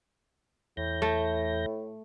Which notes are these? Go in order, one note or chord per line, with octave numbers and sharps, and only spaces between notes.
E2 A2 G6 A#6
A3